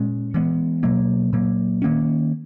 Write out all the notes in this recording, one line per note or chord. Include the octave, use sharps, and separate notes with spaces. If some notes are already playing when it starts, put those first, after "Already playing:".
Already playing: A#2 G#3 C#4
E3 G#3 B3
B2 F#3 A#3
A#2 F#3 A#3
D#3 A#3 C#4